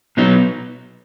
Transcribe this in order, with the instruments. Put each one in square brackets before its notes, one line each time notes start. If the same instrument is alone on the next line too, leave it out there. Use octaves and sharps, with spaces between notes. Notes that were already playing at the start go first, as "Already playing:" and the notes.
[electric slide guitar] B2 F#3 B3 D#4